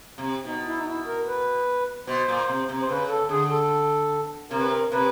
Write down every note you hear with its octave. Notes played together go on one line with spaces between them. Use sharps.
C3
B2 D#4
E4
D#4
E4
A#4
B4
B2 C5
A#2
C3
C3
C5
C#3 B4
A4
D3 G#4
A4
C3 A#4
B4
A#4
C3 B4